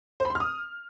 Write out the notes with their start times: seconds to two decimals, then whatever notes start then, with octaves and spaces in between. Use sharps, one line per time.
0.20 C5
0.25 B5
0.30 C6
0.35 F6
0.40 D#6